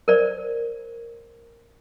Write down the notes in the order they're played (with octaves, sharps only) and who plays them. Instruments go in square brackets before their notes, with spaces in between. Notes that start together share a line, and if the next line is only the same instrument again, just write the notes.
[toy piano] A#4 C5 D5